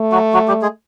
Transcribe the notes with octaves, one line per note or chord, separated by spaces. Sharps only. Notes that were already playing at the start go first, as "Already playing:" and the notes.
Already playing: A3
F#3 F#4
F#3 F#4
G3 G4
G#3 G#4